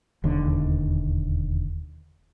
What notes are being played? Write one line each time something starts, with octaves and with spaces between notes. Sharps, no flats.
E1 D#2 D3